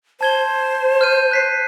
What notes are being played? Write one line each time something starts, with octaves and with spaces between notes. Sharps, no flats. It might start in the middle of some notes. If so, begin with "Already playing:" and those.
C5 A5 G#6 G7
F6 G6 D#7
F#6 B6 C7